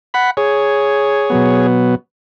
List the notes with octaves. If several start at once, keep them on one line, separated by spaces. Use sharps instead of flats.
F#5 B5
G#4 C#5
B2 F#3 B3